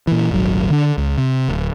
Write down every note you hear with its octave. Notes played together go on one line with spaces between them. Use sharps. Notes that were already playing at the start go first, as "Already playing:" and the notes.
A#2 E3
D#1 G#1 F#3
D3 D4
C#2
C3
D1